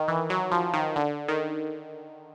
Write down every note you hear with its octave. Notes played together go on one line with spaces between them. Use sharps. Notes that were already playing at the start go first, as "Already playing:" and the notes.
Already playing: D#3
E3
F#3
F3
D#3
D3
D#3